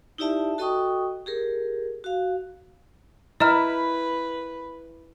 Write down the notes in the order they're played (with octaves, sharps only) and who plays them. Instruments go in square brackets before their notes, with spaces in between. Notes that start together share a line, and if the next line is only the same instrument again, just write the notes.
[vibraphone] D#4 E4 G4 D5 E5 A5
F#4 A4 D#5 G5 C#6 D#6
G4 G#4 A#4
F#4 F5
[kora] E4 [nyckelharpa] B4 [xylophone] D#5 A#5 F6